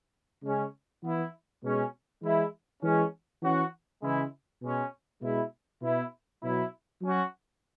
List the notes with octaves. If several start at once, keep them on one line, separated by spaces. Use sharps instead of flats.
C#3 G#3 C#4
E3 B3 E4
B2 G#3 C#4
E3 G#3 E4
E3 G#3 C#4
E3 C#4 F#4
C#3 E3 G#3 E4
B2 G#3 C#4
B2 G#3 E4
B2 B3 E4
B2 F#3 E4
F#3 C#4 F#4